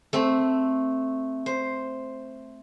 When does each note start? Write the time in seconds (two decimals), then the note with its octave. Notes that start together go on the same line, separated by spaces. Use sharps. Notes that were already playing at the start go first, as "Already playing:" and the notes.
0.13 A3 C4
1.46 C5